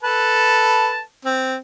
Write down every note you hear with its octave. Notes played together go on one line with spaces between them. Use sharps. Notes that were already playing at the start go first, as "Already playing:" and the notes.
A4 B4 A5
C4